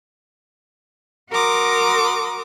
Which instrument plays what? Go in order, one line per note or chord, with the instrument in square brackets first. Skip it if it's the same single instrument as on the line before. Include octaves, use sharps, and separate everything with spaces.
[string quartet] F#4 A#4 A#5 C6 D6 D#6